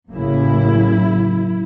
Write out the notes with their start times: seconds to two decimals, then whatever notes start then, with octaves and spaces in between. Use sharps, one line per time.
0.11 A1 F#2 C#3 A#3 E4